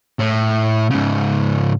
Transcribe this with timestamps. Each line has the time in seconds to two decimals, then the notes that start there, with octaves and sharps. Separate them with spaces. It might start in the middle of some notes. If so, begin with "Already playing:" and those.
0.19 A2
0.90 G#2 C#3